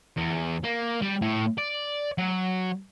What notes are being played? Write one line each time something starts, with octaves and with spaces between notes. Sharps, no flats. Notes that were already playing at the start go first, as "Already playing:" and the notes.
E2
A#3
G3
A2
D5
F#3